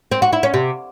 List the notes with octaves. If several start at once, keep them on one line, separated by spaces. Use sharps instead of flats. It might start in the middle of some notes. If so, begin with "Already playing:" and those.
C4
F#4
E4
C#4
C3